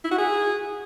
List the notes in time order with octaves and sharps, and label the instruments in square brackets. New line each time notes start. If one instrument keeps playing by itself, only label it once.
[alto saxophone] E4
F#4
G#4